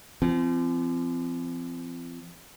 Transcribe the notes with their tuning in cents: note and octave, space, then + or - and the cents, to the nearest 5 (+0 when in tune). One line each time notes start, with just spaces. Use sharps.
F3 -40 C4 -20